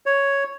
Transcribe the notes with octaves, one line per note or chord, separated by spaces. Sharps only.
C#5